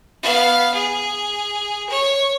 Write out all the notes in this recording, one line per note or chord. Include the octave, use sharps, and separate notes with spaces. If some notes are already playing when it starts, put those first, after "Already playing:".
B3 F5
G#4
C#5